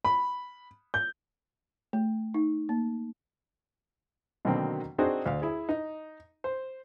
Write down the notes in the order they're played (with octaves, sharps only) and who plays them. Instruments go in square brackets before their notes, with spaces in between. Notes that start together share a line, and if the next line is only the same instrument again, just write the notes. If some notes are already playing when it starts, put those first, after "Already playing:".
[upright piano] B5
G6
[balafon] A3
D#4
A#3
[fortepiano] B2 D3 D#3 F#3 A#3 C4
C4 D4 D#4 F#4 G#4 C5
D2 F5
E4 G#4
D#4
C5